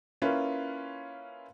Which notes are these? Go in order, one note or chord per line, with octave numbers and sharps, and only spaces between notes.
A#3 C#4 E4 F4 B4